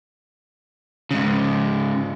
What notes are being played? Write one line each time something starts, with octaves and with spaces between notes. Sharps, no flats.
G#2 C#3